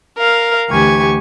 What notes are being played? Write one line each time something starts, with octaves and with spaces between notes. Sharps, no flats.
A#4 F5
D2 E3 G4 G#5 C#6 G#6